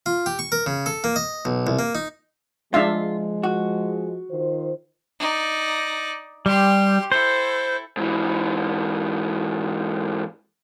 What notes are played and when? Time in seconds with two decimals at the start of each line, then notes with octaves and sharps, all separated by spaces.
0.06 F4
0.26 G4
0.39 C#6
0.52 A#4
0.66 C#3
0.86 A4
1.04 A#3
1.16 D#5
1.45 B1
1.67 C2
1.79 A#3
1.95 D#4
2.74 F3 G#3 D4 F4 E5 F5
3.43 F#4
4.30 D#3 F4 C5
5.19 D#4 D5
6.46 G3 G4 C6
7.12 E4 A4 C5
7.97 G#2 E3